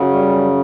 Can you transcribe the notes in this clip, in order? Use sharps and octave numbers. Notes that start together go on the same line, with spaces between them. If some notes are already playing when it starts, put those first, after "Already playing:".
Already playing: F#2 C#3 F#3
G3